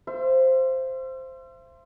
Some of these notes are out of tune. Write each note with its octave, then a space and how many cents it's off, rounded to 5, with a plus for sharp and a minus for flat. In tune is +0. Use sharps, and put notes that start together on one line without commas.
C5 +0 E5 +45